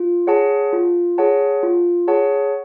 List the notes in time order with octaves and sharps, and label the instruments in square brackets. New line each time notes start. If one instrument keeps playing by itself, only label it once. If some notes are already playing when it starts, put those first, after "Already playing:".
Already playing: [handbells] F4
G#4 C#5 F#5 A5
F4
G#4 C#5 F#5 A5
F4
G#4 C#5 F#5 A5